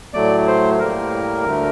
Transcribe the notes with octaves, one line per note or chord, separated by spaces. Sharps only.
A2 F#3 A3 D5
C5
A2 G3 A#3 A#4
D2 D3 A3